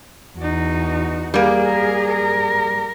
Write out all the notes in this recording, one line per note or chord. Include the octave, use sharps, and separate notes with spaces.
E2 D#4 F#4
G3 A#3 G#4
A#4
A#4